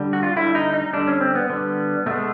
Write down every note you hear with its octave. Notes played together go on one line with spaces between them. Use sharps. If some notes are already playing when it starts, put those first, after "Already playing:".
Already playing: D3 G3
F#4
F4
D3 G3 E4
D#4
D#4
D3 G3 D4
C#4
C4
B3
D3 G3
B2 G#3 A3